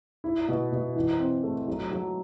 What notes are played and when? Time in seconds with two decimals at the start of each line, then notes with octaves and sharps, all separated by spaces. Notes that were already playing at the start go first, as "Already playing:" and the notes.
0.24 E4
0.48 B2
0.72 B2
0.96 E3
1.19 C4
1.44 A3
1.68 F#3
1.92 F#3